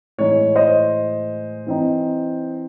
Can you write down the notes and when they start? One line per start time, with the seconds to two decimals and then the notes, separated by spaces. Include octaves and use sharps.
0.18 A2 E3 G#3 D#4 C#5
0.56 C5 D#5
1.67 E3 C4 D#4